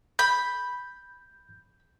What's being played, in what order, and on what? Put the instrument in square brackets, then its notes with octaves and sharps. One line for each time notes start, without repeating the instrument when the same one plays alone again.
[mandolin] B5 [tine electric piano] G6